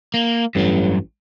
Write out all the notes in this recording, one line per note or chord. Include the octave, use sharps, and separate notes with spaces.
A#3
A1 G2 F#3